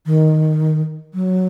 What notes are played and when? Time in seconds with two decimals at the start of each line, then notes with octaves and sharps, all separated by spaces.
0.06 D#3
1.14 F#3